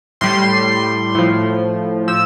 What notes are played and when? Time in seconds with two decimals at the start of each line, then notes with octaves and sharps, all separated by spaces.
0.21 A2 G3 C6
1.15 A2 F3
2.08 F3 E6